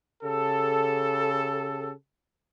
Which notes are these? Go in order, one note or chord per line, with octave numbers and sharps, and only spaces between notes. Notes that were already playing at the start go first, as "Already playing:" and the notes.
C#3 G4 A4